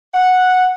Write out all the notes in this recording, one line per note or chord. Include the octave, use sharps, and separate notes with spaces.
F#5